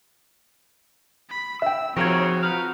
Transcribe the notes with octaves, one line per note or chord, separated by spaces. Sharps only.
B5
E5 G5 E6
D#2 C#3 F3 C4 F#4 G#6 A#6
D#4 B4 F5